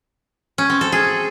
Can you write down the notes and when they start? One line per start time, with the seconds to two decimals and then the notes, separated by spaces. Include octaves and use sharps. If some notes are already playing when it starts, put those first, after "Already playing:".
0.58 C#4
0.70 C4
0.81 A4
0.92 G#4